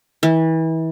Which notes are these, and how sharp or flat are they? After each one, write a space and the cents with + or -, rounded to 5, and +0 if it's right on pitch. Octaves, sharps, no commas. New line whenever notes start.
E3 -30